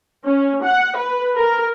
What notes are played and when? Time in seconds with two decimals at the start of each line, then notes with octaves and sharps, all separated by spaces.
0.25 C#4
0.64 F#5
0.96 B4
1.36 A#4